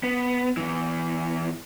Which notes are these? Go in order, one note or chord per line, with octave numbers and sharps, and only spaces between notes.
B3
E2 E3